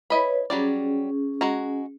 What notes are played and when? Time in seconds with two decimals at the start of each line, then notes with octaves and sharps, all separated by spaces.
0.10 E4 B4 C#5 D#5 B5
0.50 F#3 G3 C#4 G#4 D5
1.41 G#3 F#4 A#5